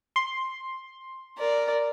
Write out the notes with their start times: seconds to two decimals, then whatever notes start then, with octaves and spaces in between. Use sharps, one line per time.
0.16 C6
1.38 A#4 D5